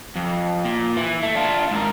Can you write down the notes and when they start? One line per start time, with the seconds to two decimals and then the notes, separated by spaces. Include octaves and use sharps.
0.16 F2
0.65 A#2
0.97 E3
1.23 A3
1.35 D4 F4
1.71 G#2 A#4